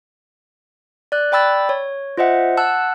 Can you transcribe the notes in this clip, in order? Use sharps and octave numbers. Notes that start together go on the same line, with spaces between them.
D5 F#6
D5 G5 B5 E6 A6
C#5
F4 C5 D#5 E5 F#5
F#5 A5 E6 F#6